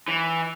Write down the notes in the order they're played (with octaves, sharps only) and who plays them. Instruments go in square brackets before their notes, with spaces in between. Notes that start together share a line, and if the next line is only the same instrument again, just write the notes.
[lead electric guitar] E3